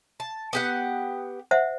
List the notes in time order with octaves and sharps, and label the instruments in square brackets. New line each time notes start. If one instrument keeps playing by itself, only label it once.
[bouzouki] A5
B3 G4 F#5
[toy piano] C5 E5 F#5